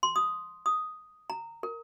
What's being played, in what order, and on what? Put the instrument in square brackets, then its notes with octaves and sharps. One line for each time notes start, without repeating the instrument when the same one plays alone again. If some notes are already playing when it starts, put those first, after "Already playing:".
[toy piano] C6
D#6
D#6
A#5
A#4